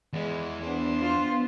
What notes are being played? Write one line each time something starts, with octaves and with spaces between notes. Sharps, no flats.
E2 E3 G#3
B3 D4 C5
F4